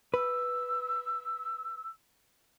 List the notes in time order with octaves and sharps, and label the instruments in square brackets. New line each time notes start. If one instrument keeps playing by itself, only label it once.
[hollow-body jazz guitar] B4 [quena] E6